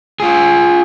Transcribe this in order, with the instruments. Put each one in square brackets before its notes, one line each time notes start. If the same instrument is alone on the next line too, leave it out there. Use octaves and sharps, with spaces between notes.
[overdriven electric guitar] F4 G#4